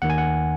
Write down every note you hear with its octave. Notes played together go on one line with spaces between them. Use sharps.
D#2 D#3 F#5
G#5
F#5